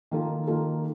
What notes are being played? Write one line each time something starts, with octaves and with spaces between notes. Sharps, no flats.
D#3 A#3 F4 A4
D#3 A#3 F4 A4